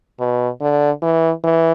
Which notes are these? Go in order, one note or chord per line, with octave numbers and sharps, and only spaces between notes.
B2
D3
E3
E3